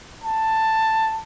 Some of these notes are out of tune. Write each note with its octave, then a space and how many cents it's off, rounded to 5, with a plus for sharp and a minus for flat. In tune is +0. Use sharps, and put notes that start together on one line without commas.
A5 +10